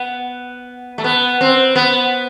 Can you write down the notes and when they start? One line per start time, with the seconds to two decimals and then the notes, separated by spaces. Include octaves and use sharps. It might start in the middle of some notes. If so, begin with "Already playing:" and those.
Already playing: B3
0.98 A3
1.04 B3
1.41 C4
1.76 B3